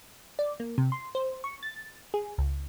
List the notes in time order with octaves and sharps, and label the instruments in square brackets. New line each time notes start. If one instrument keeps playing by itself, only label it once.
[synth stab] D5
A#3
C3
C6
C5
C#6
A6
G#4
C#2